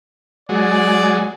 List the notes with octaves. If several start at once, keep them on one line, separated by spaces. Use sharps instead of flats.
F#3 G#3 D5